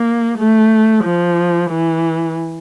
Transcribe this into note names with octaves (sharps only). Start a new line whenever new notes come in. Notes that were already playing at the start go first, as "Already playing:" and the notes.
Already playing: A#3
A3
F3
E3